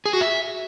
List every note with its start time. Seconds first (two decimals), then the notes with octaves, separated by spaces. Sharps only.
0.06 G#4
0.13 F#4
0.21 E5